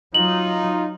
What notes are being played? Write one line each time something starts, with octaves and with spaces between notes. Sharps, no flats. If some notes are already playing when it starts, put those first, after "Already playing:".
F#3 D#4 F4 F#7